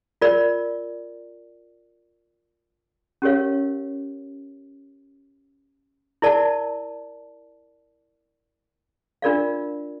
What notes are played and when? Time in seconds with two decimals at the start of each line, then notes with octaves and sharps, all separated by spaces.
0.22 F4 A#4 D5
3.22 C#4 G4 A#4 C#5 F5
6.22 E4 A#4 D5 A5
9.22 D4 F4 A#4 D5 F5